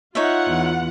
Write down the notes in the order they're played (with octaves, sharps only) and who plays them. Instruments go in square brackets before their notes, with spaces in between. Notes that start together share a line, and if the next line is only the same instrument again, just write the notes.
[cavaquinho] D#4 C#5 E5 [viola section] F4 F#5
[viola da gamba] E2